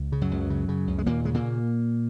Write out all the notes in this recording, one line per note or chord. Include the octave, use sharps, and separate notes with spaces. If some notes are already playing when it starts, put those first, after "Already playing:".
Already playing: C#2
C#3
F#2 F#3
C#2
C#3
C#3
C#2
G#3
D#2 A#2 A#3
C#3 G#3
A#2 A#3